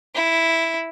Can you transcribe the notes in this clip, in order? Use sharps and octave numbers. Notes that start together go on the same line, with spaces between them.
E4